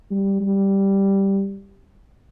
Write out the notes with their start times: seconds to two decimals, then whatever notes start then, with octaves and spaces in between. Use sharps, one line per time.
0.11 G3
0.41 G3